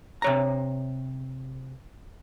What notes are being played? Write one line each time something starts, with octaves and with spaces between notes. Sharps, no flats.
C3 C#5 A#5